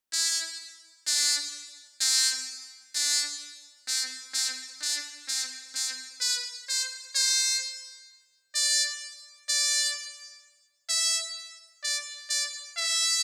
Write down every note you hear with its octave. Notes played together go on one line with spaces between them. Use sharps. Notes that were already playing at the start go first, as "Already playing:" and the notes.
E4
D4
C4
D4
C4
C4
D4
C4
C4
B4
C5
C5
D5
D5
E5
D5
D5
E5